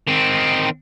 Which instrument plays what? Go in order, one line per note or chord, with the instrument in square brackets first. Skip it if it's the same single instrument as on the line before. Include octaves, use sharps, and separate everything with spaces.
[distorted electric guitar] D#3 C4